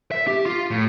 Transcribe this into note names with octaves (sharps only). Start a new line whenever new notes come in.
E5
G4
F4
A2